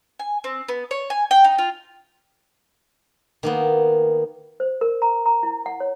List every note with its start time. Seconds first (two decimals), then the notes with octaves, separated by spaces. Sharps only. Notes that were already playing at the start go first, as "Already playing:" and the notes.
0.19 G#5
0.44 C4
0.68 B3
0.91 C#5
1.10 G#5
1.31 G5
1.44 D#4
1.58 F4
3.43 D#3 A#3 B3
4.60 C5
4.81 A#4
5.02 A#5
5.26 A#5
5.43 E4
5.66 F#5
5.80 C#5